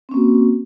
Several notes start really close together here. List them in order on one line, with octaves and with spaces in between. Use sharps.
C4 C#4 A#3 F#4